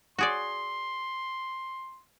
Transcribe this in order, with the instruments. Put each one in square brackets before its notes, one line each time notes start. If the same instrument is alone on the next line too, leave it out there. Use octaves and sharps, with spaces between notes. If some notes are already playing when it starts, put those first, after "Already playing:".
[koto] F#4 G#4 D5 [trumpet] C6